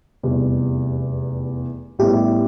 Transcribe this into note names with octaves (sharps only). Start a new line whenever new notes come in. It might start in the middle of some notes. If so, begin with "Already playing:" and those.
F1 E2 C3 G3
A1 A2 G3 B3 E4 G4